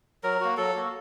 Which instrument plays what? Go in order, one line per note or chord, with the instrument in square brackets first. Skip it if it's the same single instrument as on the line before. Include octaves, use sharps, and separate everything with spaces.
[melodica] F#3 A#4
A#3 F#4
F#3 A4
A#3 F#4